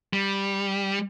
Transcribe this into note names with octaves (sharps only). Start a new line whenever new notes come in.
G3